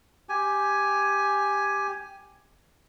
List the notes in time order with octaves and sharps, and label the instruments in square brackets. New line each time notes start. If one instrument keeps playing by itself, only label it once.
[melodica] G4 G#5